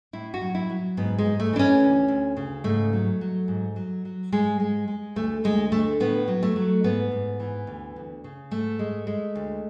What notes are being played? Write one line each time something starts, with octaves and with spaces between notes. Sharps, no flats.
A2 E4
F#4
F#3
E4
F#3
G#2 B3
G#3
G#2
A3
E3 D4
C#4
D2
D2
C#3
G#2 A3
F#3
F#3
G#2
F#3
F#3
G#2 G#3
G#3
G#3
D2 A3
D2 G#3
D3 A3
A2 B3
F#3
A3
F#3
G#2 B3
G#2
E3
D2
D2
C#3
G#2 A3
G#3
G#3
D2